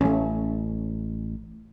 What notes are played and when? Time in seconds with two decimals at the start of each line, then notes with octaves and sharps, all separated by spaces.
0.01 A1 A3 C#4